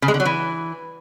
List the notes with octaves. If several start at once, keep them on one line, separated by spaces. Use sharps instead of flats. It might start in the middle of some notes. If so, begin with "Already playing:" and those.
C#3
G#3
D3
F#3
E3